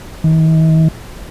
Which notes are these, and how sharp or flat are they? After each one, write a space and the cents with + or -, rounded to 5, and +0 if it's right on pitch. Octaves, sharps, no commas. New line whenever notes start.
D#3 +45